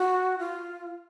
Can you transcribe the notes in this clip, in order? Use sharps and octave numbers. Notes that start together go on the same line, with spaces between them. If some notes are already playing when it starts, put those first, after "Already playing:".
Already playing: F#4
F4